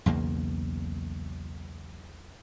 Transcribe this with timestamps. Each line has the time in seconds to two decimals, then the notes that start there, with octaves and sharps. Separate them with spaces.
0.06 B1 E2 C#3 A#3